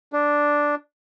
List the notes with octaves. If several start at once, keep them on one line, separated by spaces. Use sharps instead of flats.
D4